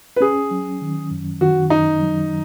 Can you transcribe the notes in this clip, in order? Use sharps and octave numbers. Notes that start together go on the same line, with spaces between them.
B4
C#4 G#4
F#3
D#3
F#2
D#3 F#4
F#2 D#4
F#3